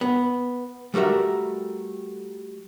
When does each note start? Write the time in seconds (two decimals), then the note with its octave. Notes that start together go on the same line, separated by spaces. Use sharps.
0.01 B3
0.94 G3 A3 F#4 A#4 E5